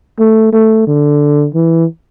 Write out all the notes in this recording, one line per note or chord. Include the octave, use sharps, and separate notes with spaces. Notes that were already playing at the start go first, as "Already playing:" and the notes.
A3
A3
D3
E3